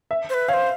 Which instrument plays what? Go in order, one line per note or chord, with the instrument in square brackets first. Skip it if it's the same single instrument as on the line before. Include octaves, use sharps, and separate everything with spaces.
[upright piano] E5
[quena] C5
B4
[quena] C#5 [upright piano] F5
[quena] C5